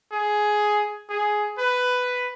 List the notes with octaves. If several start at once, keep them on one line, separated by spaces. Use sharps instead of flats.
G#4
G#4
B4